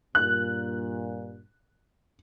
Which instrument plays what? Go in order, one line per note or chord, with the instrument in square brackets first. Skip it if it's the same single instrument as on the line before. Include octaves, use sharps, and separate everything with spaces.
[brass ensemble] G2 A#2 [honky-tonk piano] F#6